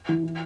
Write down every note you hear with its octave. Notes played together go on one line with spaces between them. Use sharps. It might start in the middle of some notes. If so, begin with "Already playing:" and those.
E3
E4